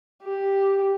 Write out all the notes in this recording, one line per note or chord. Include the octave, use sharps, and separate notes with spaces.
G4